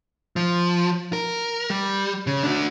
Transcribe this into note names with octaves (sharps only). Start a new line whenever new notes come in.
F3
A#4
G3
C#3
D4 F#4